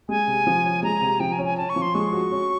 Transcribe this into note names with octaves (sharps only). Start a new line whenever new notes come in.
G#3 G#5
C3
F3
C#4
G#3 A#5
C3
F3 G5
G#5
C#4
G#5
C#4 A5
C#6
F3
C6
G#3 C#6
F#4
C#4